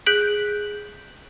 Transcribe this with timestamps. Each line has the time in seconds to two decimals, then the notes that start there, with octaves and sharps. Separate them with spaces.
0.06 G#4 F#6 G6 B6 D7 F#7